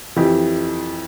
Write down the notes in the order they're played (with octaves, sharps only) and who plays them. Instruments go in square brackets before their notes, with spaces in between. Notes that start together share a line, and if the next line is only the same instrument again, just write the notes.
[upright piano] F2 E3 G4